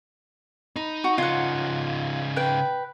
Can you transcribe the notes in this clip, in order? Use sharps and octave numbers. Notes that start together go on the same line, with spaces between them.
D#4 B5
F#4
C#3 D#4 F4 F#5
B4 G5